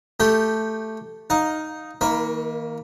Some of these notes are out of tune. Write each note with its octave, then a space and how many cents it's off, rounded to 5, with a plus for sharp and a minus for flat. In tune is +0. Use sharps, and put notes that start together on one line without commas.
A3 +0 G4 +0 G5 -15
D#4 +0 F5 +20
D#3 +40 A#3 +0 B5 +0